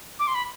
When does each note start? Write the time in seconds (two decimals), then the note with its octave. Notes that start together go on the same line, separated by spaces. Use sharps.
0.19 D6
0.27 C6
0.35 B5